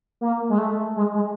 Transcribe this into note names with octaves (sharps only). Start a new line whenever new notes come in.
A#3
G#3
A3
G#3
G#3